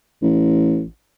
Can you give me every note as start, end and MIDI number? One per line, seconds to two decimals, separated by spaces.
0.22 0.84 33